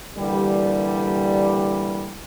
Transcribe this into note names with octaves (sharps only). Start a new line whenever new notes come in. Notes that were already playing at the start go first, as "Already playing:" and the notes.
A#2 D3 E3 G3